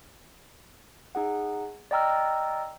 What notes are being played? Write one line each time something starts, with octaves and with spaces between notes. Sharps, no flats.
D#4 G#4 F#5
D5 D#5 G5 A#5 E6 F6